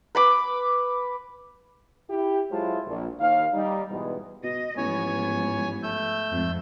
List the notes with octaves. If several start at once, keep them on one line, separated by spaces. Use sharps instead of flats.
B4 B5 D6
E4 G4
F#3 G#3 E4 F4 C5 A5
A#1
D#2 F5
G3 D#4
G#2 B2 E3 G3 G#3 B3
B2 D#5
A1 G#2 F3 B3 C#5 G#5
A3 E6 G6
F2 G#2